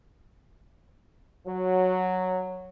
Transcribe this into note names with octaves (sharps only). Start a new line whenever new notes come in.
F#3